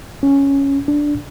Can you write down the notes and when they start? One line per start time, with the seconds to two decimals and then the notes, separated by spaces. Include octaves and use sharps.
0.23 C#4
0.88 D4